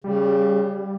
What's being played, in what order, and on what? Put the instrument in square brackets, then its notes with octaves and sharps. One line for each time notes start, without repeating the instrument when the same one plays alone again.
[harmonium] C#3 [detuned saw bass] G3